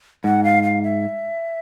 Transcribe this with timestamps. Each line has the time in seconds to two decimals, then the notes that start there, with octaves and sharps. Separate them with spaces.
0.24 G#2 F#5
0.44 F5
0.63 F5
0.83 E5